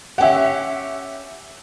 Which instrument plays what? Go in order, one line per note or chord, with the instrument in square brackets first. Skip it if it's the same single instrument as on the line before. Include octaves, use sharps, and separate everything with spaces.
[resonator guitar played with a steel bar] C#4 G4 [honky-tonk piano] E5 F#5